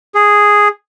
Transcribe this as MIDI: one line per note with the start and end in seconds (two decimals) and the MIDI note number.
0.15 0.68 68